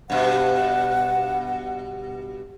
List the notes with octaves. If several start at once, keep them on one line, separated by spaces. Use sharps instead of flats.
G2 B2 F#5